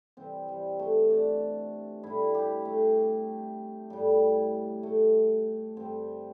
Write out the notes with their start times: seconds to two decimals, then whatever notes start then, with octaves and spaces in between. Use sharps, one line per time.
0.17 C3 E3 G3 C4
0.48 G3
0.79 A3
1.10 D4
2.03 A2 G3 E4
2.35 G4
2.65 A3
3.90 A2 G3
4.83 A3
5.77 G2 D3 G3 C4